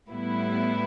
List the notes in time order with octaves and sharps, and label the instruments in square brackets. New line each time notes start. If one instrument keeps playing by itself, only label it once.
[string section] A2 G3 B3 E4